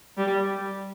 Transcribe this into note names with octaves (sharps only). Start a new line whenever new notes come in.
G3